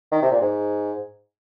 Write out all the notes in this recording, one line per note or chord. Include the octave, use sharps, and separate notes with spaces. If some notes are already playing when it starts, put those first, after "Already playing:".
D#3
C3
A#2
G#2